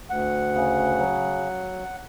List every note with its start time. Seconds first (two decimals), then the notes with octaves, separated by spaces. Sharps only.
0.10 D2 F#5
0.55 C#3
0.99 F#3